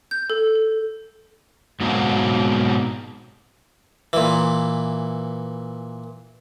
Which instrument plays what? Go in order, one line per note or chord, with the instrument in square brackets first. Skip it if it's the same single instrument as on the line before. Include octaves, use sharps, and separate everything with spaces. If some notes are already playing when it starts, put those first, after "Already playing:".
[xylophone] G6
A4
A4
[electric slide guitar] G#2 B2 F#3 A#3 C4
[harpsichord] A#2 E3